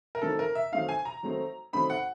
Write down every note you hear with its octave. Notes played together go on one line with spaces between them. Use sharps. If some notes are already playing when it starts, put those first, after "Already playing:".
A#4
D#3 F#3 A3 C4 D#4 A4
A#4
E5
D#3 F#3 A3 C4 D#4 F5
G#5
A#5
D#3 F#3 A3 C4 D#4
D#3 F#3 A3 C4 D#4 B5
F#5